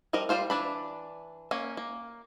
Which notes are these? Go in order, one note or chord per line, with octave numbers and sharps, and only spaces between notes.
F3 G3 A#4 D#5
G3 F4 C5 F5
E3 D4 B5
A#3 C#4
A#3